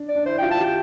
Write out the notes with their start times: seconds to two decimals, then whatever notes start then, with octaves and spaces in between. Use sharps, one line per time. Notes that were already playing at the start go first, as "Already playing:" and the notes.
Already playing: D4
0.08 D5
0.15 D4
0.26 E4 C5
0.38 F4 G5
0.51 A5
0.60 G4 G5